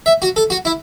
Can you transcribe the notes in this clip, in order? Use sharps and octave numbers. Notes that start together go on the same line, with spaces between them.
E5
F#4
A4
F#4
E4